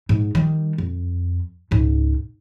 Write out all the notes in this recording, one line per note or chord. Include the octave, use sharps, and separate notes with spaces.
G#2
D#3 G3
F2
C#2 G#2